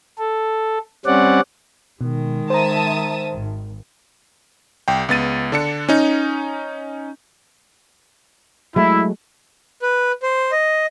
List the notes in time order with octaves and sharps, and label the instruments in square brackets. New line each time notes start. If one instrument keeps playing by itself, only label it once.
[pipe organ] A4
G3 C4 C#4 D5 F#5
[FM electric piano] B2 [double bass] D#3 G#3
[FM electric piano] C5 A#5 [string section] E5 A5 D#6
[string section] G#1
[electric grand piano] C2 G5
C#2 B3 A6 D#7
D3 D4 C#7
C#4 D#4
[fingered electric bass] F#3 G#3 A3 [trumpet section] E4
[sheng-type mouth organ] B4
C5
D#5